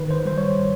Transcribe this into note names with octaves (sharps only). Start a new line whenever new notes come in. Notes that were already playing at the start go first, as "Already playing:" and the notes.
Already playing: D#3 B4
C5
G3 C5
C#5